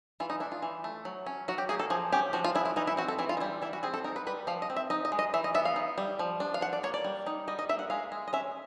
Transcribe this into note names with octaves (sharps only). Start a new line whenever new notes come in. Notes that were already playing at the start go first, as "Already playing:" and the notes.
E3 F4
D#4
D4 E4
F4
E3
A3
F#3
C#4
F#3 F#4
G4
A#3 G#4
A4
F3 G#4
C#4 G4
F3 F#4
F4
G#3 E4
E4
E3 D#4
E4
C4 F#4
A4
E3 E4
F4
D#4
G3 E4
E3 E4
F#4
C4 G#4
A4
D#4 A#4
B4
G3 B4
F3 F5
D#5
C4
E5
D#4 D#5
D#5
G#3
D#5
E3 E5
D#5
B3 E5
F5
D#4
G3
F3
D4
F5
F3 F#5
D5
A#3 C#5
D5
G3
D#4
G3 D#5
D#5
A#3 E5
F#5
G#3 F5
G#3
D#5
C#4 E5